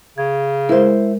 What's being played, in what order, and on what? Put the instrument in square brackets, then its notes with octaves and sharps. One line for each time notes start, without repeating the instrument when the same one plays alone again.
[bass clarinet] C#3 [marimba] G#6
[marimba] G#3 A#4 [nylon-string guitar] E4 C5